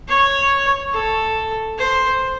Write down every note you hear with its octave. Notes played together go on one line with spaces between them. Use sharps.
C#5
A4
C5